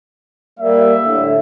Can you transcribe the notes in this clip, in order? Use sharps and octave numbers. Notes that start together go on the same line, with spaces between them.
G3 A#3 E5
A2 D3